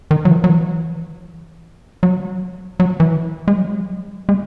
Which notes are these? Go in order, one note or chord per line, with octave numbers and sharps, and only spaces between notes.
D#3
F#3
E3
F#3
E3
F#3
F#3
E3
G#3
F#3
G#3